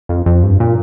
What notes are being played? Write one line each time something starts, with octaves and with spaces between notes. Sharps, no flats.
F2
F2
G2
A#2